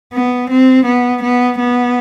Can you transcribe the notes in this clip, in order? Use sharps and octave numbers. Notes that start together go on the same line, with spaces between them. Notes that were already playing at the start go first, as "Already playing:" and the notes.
B3
C4
B3
B3
B3